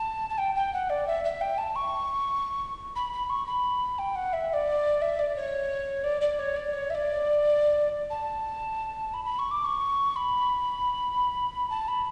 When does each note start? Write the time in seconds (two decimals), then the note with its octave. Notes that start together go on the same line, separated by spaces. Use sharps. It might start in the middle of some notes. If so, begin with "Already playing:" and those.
Already playing: A5
0.29 A5
0.38 G5
0.55 G5
0.73 F#5
0.89 D5
1.07 E5
1.24 E5
1.41 G5
1.58 A5
1.75 C#6
2.95 B5
3.12 B5
3.29 C#6
3.46 B5
3.98 G5
4.15 F#5
4.33 E5
4.49 E5
4.53 D5
5.01 E5
5.19 D5
5.36 C#5
6.03 D5
6.21 D5
6.39 C#5
6.56 D5
6.73 C#5
6.90 E5
6.94 D5
8.10 A5
9.13 B5
9.25 B5
9.38 C#6
9.51 D6
9.64 C#6
10.16 B5
11.70 A5
11.88 B5